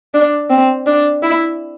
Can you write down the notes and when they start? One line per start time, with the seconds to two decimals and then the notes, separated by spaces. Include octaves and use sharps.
0.14 D4
0.50 C4
0.86 D4
1.23 E4